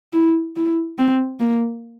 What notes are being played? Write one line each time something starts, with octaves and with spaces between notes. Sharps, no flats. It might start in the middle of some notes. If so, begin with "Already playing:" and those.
E4
E4
C4
A#3